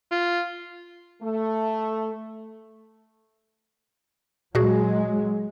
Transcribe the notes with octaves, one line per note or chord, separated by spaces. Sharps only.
F4
A3
A#2 F#3 G#3 F#4 G#4